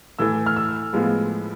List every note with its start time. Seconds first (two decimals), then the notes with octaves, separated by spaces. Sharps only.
0.19 A2 E3 A3 E6
0.46 F6
0.56 E6
0.93 A2 F3 G#3 B3